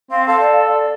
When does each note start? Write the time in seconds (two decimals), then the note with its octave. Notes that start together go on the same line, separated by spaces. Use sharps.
0.11 C4 F5
0.28 A4 F5
0.40 D5